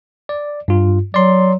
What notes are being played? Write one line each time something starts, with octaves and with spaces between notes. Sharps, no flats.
D5
G2 F4
F#3 D5 C6